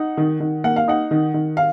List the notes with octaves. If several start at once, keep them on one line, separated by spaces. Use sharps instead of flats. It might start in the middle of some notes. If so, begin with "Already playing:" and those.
Already playing: D#4 F#5
D#3
D#3
A#3 F#5
F5
D#4 F#5
D#3
D#3
F5